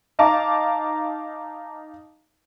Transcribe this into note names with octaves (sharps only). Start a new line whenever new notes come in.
D#4 F5 A5 A#5 D6